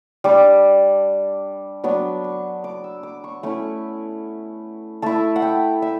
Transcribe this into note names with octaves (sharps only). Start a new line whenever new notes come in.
G3 D4 D6
F#3 B3 D4 C#6
C#6
D6
E6
D6
C#6
A3 C#4 E4 C#6
A3 E4 A5
F#5
G5
E5